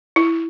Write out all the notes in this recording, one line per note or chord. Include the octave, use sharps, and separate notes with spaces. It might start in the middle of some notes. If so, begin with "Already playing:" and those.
E4